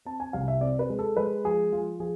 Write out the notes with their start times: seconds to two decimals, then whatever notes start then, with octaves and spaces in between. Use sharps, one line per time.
0.05 C4 A5
0.20 G#5
0.33 C2 F5
0.48 E5
0.61 C4 D5
0.79 B4
0.89 G#3
0.99 A4
1.17 G#3 B4
1.44 F3 G#4
1.72 F3 F4
2.00 F3 G#4